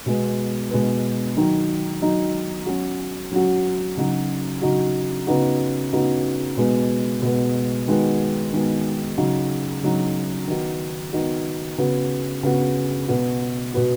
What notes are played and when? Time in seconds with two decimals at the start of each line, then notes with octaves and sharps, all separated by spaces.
0.06 B2 G#3 B3
0.71 B2 G#3 B3
1.36 D#3 F#3 D#4
2.02 D#3 F#3 D#4
2.66 F#3 C#4 F#4
3.32 F#3 C#4 F#4
3.97 C#3 F#3 D#4 F#4
4.62 C#3 F#3 D#4 F#4
5.27 C#3 B3 D#4 F#4
5.92 C#3 B3 D#4 F#4
6.57 B2 G#3 B3
7.22 B2 G#3 B3
7.87 D#3 G#3 B3 F#4
8.53 D#3 G#3 B3 F#4
9.18 C#3 F#3 D#4 F#4
9.83 C#3 F#3 D#4 F#4
10.48 D#3 B3 D#4 F#4
11.13 D#3 B3 D#4 F#4
11.78 C#3 B3 F#4
12.43 C#3 B3 F#4
13.08 B2 B3 F#4
13.74 B2 B3 F#4